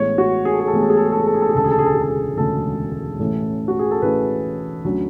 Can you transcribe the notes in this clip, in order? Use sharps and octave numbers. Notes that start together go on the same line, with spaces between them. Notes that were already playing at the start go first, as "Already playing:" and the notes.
Already playing: A1 A2 G#3 B3 C#5
F#4
G#4
A4
G#4
A4
A1 A2 G#3 B3 G#4
A4
G#4
A4
G#4
A4
G#4
A4
G#4
A4
G#4
E1 D2 C#3 G#3 A4
G#4
A4
G#4
A4
G#4
A4
G#4
E1 D2 C#3 G#3 A4
A1 A2 E3 A3 C#4
F#4
G#4
A4
A1 A2 E3 A3 C#4 B4
D2 D3 F#3 C#4